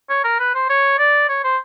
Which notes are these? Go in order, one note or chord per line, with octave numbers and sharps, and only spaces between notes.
C#5
A#4
B4
C5
C#5
D5
C#5
C5